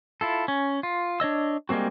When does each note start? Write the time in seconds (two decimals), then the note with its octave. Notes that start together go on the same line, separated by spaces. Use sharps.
0.21 E4 F4 A4
0.48 C#4
0.83 F4
1.20 D4 C#5 D#5 E6
1.69 G3 G#3 A#3 C4 F#4